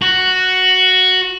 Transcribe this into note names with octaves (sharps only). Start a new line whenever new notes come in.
F#4